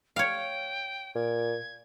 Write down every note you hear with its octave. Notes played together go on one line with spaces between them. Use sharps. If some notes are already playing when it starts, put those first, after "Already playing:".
C#5 F5 G5
A#2 G#6